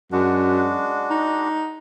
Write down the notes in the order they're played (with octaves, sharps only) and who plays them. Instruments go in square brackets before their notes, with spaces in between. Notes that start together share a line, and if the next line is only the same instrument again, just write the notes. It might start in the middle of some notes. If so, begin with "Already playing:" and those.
[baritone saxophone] F#2 [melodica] G#3 D4 F#4
[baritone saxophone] D#4